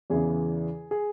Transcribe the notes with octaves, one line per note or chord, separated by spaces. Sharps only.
E2 C#3 E3 G#4
G#4